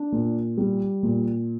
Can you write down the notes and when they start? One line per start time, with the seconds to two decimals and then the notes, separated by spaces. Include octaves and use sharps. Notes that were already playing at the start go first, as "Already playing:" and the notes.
Already playing: D4
0.12 A#2
0.57 G3
1.03 A#2